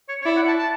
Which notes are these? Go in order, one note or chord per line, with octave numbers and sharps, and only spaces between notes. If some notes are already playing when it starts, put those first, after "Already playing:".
C#5
C#5
E4 D5
F#5
A5
A5